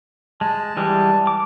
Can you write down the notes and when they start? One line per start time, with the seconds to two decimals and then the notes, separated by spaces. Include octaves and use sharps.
0.41 G#3 A5
0.77 E3 G3 G#3
1.27 D6